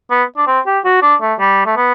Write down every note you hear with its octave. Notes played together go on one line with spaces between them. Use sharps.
B3
D4
C4
G4
F#4
D4
A3
G3
A3
B3